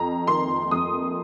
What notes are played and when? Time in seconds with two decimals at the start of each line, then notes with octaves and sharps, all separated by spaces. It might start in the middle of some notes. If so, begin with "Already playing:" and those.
Already playing: F2 A#5
0.27 D#3 C6
0.71 F2 D#6